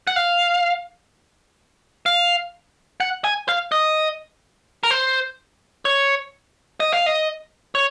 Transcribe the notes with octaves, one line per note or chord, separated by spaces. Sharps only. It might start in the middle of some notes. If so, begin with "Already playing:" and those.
F#5
F5
F5
F#5
G#5
F5
D#5
A#4
C5
C#5
D#5
F5
D#5
C#5